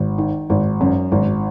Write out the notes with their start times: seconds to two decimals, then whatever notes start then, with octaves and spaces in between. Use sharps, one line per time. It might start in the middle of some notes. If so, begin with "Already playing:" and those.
Already playing: G#1
0.18 D#3
0.50 G#1
0.81 F#2
1.12 G#1